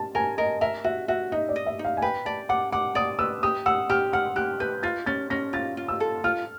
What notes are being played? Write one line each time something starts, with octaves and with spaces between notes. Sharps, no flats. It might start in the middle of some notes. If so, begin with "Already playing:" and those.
Already playing: A5
A#4 G#5
A#4 D#5
A#4 E5
F#4 E5
F#4 E5
D#4 D#5
D5
D#5
E5
D#4
F5
G#5
B4 G5
D5 A5
F#5 D6
F#5 D6
D5 D#6
B4 E6
G4 D#6
F#5 E6
G4 F6
F#5 F6
G4 F#6
B4 G6
F4 A6
C#4 A6
C#4 A#6
F4 A6
F4
E6
A4
F4 F6